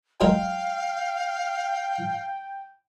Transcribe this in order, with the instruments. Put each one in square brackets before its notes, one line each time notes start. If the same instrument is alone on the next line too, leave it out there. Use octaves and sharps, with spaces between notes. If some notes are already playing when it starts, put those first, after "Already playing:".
[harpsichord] F#3 G#3 A#4 [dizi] F5 [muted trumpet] G5